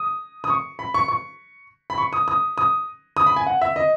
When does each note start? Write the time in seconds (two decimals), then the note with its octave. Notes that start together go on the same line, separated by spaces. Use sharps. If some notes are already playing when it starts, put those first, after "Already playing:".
Already playing: D#6
0.44 D#6
0.50 C#6
0.79 B5
0.94 C#6
1.08 C#6
1.90 B5
1.98 C#6
2.13 D#6
2.28 D#6
2.58 D#6
3.17 D#6
3.26 B5
3.36 G#5
3.47 F#5
3.61 E5
3.76 D#5